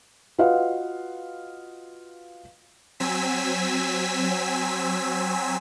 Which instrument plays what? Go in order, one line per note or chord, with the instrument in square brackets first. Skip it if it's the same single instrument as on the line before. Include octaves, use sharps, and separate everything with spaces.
[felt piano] F4 F#4 B4 D#5 F5 F#5
[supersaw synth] F#3 C4 G#5 E6 B6